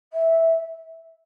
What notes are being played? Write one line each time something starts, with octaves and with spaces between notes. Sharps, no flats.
E5